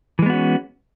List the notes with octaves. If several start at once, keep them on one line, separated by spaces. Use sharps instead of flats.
E3 G#3 B3 C#4 F#4